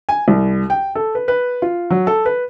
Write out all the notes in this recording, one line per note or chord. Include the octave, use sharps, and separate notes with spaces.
G#5
C2
G5
A4
B4
B4
F4
F#3
A4
B4